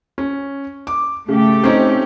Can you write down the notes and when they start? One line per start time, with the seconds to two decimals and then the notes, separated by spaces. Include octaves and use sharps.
0.18 C#4
0.87 D6
1.29 C#3 A3 G4
1.64 C4 C#4 D#4